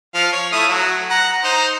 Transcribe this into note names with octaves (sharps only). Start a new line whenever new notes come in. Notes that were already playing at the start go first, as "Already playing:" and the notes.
F3 F5
C#5
A3 E4 D#6
F#3
F#5 A#5
D#4 C5